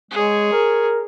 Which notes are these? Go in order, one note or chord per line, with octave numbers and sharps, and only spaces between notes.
G#3 G#4 C#5
A#4